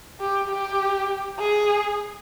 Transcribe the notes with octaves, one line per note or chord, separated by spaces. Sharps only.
G4
G4
G#4